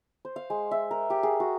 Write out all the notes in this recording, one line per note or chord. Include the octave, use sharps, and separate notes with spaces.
C5
F5
G#3
E5
A#4
G4
G#4
F#4